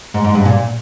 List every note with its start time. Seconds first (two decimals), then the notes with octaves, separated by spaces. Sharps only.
0.14 G#2
0.24 G#2
0.35 G2
0.45 A#2